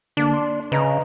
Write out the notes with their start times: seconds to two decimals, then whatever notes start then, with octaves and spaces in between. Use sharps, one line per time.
0.17 D3 A#3 D4
0.33 C6
0.72 C#3 B4 D#5 A#5